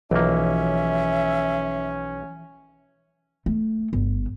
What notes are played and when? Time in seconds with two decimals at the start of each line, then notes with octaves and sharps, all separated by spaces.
0.11 B1 E3 F3 A#3 C#4 E5
3.46 A3
3.93 G1